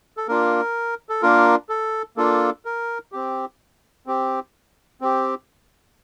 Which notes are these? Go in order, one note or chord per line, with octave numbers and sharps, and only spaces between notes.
A4
A#3 D4 F4 A#4
A4
A#3 D4 F4 A#4
A4
A#3 D4 F4 A4
A#4
C4 G4
C4 G4
C4 G4